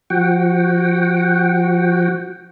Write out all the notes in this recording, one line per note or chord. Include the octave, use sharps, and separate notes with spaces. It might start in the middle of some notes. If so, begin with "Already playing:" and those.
F3 F#4 F#5 G5